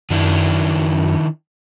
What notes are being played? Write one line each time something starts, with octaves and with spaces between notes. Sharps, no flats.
F#2 D#3 D4 E4